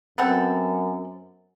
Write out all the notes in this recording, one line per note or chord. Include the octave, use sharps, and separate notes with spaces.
F#2 B3 C4 A4